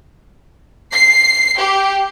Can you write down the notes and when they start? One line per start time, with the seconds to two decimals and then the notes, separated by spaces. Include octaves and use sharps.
0.93 C7
1.58 G4